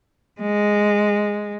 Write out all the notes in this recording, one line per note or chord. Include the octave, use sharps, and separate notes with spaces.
G#3